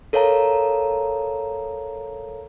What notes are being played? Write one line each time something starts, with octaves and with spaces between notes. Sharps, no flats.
A4 A#4 C#5 F5 A5 A#5